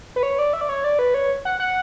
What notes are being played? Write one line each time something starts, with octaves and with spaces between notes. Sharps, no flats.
B4
C#5
D5
E5
D5
C#5
D5
B4
C#5
F#5
F#5